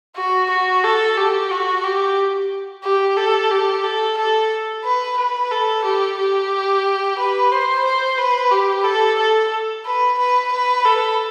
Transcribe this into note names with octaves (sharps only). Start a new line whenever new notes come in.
F#4
F#4
A4
G4
F#4
G4
G4
A4
G4
A4
A4
B4
B4
A4
G4
G4
B4
C5
C5
B4
G4
A4
A4
B4
B4
B4
A4